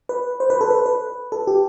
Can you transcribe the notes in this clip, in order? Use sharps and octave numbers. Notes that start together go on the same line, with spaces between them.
B4
C5
B4
A4
B4
B4
A4
G4